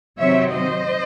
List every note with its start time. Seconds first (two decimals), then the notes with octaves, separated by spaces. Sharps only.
0.19 C3 D#3 F#3 C4 C#5 E5
0.52 C5 D#5